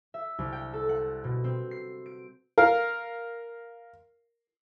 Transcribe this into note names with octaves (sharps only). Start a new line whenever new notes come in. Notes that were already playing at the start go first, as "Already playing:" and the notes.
E5
C2
G5
A4
F#5
B2
C4
C7
D7
A#4 F5